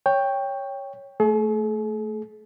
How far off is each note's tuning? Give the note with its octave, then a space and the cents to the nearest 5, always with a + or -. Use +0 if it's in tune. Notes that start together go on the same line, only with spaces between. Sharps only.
C#5 +0 G5 +10
A3 +0 G#4 +45